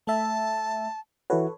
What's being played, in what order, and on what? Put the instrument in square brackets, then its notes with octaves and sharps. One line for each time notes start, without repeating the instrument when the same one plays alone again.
[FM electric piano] A3 E5 [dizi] A5
[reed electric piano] E3 E4 F#4 [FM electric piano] A4 B4 C#5